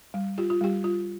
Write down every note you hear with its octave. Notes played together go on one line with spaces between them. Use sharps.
G3
F4 G4
F4
G3 G4
F4